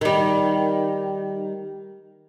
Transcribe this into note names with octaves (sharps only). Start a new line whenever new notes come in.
D#3 G3